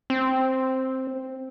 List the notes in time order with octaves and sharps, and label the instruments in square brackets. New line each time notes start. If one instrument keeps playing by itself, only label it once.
[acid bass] C4